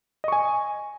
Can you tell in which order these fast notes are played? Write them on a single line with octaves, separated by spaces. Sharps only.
D#5 C#6 G#5